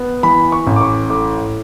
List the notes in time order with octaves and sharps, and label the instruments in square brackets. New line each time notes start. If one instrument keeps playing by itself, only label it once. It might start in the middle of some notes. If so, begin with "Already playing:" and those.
Already playing: [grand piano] B3
E3 B5
C#6
A1
D6
C#6
A2 D6